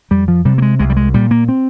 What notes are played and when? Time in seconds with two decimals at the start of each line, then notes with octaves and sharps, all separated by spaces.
0.11 F2 G3
0.28 F3
0.45 C3 G3
0.58 A#3
0.62 G#3
0.79 C2 G#3
0.90 G3
0.96 G#3
1.14 A#2 G3
1.31 A#3
1.48 C4